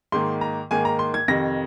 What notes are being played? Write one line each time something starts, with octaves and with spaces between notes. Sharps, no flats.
G#2 D#3 A#3 C6
A#5
G#2 D#3 A#3 G#5
A#5
C6
G#6
F2 C3 D#3 A#6